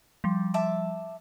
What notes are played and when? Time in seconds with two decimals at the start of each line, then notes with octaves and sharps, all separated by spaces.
0.24 F3 G3
0.54 E5 A5 D6